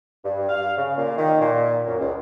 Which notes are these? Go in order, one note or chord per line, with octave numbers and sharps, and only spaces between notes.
G2
F5
C#3
A#2
D#3
A#2
F#2
C#2